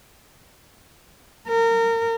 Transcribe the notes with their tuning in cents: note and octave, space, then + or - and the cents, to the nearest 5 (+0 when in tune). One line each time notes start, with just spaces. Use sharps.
A#4 -25